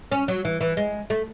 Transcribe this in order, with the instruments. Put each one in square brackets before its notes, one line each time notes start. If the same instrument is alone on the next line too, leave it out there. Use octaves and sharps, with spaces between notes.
[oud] C#4
F#3
E3
E3
G#3
A3